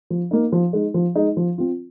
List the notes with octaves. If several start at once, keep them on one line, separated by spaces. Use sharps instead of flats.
F3
A#3 D#4
F3
G#3 D#4
F3
G#3 D#4
F3
C4 F4